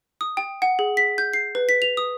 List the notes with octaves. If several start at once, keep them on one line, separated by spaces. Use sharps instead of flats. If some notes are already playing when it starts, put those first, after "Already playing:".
D#6
G5
F#5
G#4
B6
G6
C7
B4
B6
F7
D#6